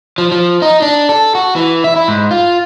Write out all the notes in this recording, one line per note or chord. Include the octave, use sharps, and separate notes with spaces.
F3
F3
D#4
D4
A4
F#4
E3
E5
E4
G#2
F4